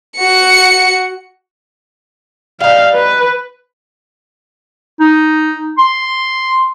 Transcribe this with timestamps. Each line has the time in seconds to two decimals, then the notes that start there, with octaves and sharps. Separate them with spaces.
0.18 F#4 C#7
2.60 G3 D#4 F5
2.94 B4
5.01 D#4
5.78 C6